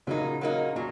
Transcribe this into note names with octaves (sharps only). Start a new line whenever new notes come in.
A#2 C#3 F#3 A#3 D#4
F#3 A#3 D#4
A#2 F#3